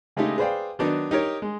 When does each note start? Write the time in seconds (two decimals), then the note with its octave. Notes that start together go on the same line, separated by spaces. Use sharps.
0.17 C#3 G#3 A3 D#4 G4
0.38 G#4 B4 C5 D5 F5 G5
0.79 D#3 F#3 B3 D4 D#4
1.11 D#4 G4 A#4 C#5
1.42 G#3